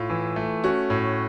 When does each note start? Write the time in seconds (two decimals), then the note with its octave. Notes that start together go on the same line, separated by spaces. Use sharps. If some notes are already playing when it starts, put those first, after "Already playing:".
Already playing: A2 F4
0.10 E3
0.36 A3
0.64 C#4 F#4
0.90 A2